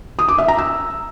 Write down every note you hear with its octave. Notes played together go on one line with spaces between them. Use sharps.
D#6
D6
E5
A#5
E6